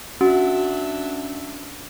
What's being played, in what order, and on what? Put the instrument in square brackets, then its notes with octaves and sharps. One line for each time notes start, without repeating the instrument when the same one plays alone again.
[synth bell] C#4 [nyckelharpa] D4 E5 [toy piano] F#4